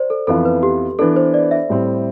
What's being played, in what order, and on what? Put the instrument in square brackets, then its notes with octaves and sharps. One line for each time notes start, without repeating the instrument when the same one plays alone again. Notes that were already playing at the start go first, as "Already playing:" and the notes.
Already playing: [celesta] C5 D5
A4
[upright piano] F2 E3 B3 F4 [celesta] A4
[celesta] B4
G4
[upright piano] E3 B3 D4 [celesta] A4
[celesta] C5
D5
E5
[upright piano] A2 G3 C4